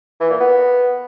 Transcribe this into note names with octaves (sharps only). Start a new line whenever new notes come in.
E3
A#2
B3